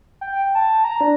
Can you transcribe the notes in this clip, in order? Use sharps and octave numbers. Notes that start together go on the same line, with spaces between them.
G5
A5
A#5
D4